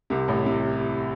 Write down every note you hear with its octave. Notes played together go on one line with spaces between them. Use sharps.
C2 C3
A1 A2
C3